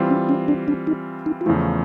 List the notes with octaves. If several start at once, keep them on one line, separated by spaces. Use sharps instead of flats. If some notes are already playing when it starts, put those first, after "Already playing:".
Already playing: E3 G3 C4 F4
C#4
C#4
D4
D4
D#4
D#4
F4
E2 C#3 F3 A3 E4